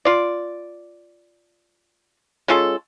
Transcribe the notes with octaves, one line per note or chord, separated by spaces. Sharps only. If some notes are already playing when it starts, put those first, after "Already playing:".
F4 D5
G#3 C#4 F4 A4